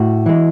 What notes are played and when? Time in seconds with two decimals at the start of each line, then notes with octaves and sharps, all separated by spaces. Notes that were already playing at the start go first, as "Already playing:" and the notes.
Already playing: A2 F#4
0.26 E3 G#3